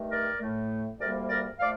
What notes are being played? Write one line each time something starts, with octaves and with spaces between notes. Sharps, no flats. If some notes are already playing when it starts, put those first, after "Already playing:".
Already playing: G2 D#3 A3
A#4 D5
A2 A3
D2 C3 G3 A#3 A#4 D5
A#4 D5
A#2 F3 A3 D5 F5